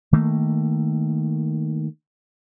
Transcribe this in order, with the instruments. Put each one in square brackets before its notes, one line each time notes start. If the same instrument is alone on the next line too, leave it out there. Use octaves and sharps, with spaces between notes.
[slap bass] D#3 A3 A#3